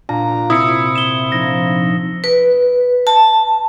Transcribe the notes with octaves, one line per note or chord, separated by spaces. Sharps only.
A#2 D4 F4 A5 A#5
C3 E4 D#6 E6 C#7
E7 G7
F3 D4 D#4 A#6
B4
A5